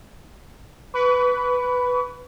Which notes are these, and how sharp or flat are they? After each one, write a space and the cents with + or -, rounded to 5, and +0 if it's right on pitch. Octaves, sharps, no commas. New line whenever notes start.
B4 +5 C#6 +45